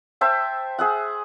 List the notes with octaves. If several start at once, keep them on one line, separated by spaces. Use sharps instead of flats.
C5 E5 G5 A5
G#4 E5 F#5